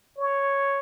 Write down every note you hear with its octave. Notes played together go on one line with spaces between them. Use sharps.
C#5